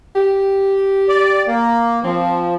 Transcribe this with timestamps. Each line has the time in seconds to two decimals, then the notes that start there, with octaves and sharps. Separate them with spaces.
0.16 G4
1.09 D5
1.47 A#3
2.04 F3 C4